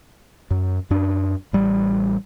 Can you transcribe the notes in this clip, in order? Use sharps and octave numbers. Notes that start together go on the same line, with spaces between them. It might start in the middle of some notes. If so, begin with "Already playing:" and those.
F#2
F#2 D4
A1 G3